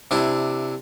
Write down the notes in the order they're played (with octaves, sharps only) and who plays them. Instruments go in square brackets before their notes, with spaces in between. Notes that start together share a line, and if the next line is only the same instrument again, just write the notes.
[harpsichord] C3 D4 E4